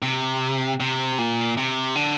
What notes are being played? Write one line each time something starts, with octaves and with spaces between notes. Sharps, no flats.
C3
C3
A#2
C3
D3